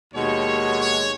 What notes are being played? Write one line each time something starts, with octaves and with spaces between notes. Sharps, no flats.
D#2 B2 G#3 C#5
C#5